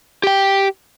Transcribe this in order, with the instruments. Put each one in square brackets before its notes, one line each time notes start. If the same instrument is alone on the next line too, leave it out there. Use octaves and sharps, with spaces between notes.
[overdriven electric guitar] G4 G5